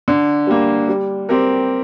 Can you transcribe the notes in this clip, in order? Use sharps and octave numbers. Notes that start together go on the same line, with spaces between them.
D3
G3 A#3
G3
C4 G4 A#4